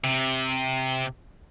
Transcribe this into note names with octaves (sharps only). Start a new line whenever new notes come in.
C3